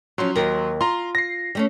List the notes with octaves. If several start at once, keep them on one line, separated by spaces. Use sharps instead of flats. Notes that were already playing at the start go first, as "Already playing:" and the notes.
F3 F#3 C#4 C6
D#2 A#4
F4 A#5 C6
A#6 C7
G3 A3 C#4